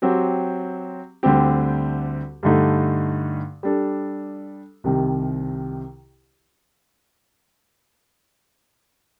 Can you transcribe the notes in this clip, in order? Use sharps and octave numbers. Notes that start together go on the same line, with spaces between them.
F#3 C4 G4
D2 D3 G3 C4 G4
G2 D3 A3 D#4
G3 D4 A4
C2 C3 D#3